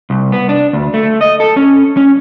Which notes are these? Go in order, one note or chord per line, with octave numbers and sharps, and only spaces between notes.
C2
B3
D4
D2
A3
D#5
A4
C#4
C#4